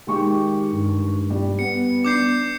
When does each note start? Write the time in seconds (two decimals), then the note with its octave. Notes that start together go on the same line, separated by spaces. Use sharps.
0.07 D#3 G#3 G4 C#6
0.72 G2
1.30 G3
1.59 B3 C#7
2.05 D4 D6 G6 C7